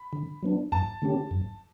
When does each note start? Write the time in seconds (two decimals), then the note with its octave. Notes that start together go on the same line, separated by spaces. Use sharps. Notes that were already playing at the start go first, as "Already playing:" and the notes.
Already playing: B5
0.13 D3
0.43 F#3 B3 D4
0.72 F#2 A5
1.02 D3 A3 C#4 G4
1.31 F#2